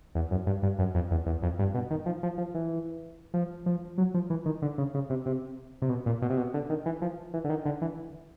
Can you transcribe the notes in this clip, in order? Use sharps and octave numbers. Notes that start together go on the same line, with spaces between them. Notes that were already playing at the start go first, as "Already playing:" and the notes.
E2
F#2
G2
G2
F#2
F2
E2
E2
F2
G2
B2
D#3
F3
F3
F3
E3
F3
F3
F#3
F3
E3
D#3
D3
C#3
C#3
C3
C3
C3
B2
A#2
B2
C3
B2
D3
D#3
E3
F3
E3
D3
D#3
D3
E3